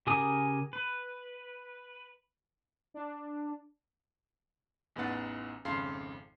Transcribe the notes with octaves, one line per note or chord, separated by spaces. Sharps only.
C#3 G4 A#4 G#5 D#6
B4
D4
A1 E2 D#4 B4 F#5 A6
G#1 F2 C#3 F5 C6 C7